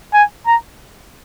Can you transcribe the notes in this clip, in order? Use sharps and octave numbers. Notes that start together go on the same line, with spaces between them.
G#5
A#5